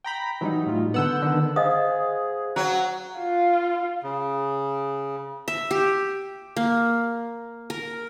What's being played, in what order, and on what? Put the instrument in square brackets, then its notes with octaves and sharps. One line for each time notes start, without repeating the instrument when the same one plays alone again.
[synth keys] G5 A#5 B5
[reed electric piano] E3 [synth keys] F#3 G3 D#4
[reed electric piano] A2 F4
[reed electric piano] D3 B3 [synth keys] F#5 E6 G6
[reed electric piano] D3 D#3 B3
[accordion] G#4 [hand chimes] C5 F5 F#5 [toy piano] D#5 D#6
[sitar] F#3 [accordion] F#6
[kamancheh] F4
[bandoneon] C#3
[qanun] E5
G4
A#3
A#4